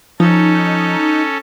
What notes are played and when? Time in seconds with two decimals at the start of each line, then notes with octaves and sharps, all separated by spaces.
0.20 F3 C#4 D#4 A4